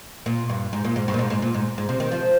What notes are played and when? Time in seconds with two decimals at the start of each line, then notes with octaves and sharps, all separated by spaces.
0.26 A#2
0.49 G2
0.73 G#2
0.84 A#2
0.96 G#2
1.08 G2
1.14 A#2
1.19 G#2
1.30 G#2
1.42 A#2
1.54 G#2
1.78 G#2
1.89 C3
2.00 D#3
2.12 F3